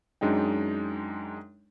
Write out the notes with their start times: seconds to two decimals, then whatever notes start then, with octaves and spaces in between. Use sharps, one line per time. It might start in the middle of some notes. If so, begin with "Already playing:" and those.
0.21 F#2 G#3 D4 D#4 G5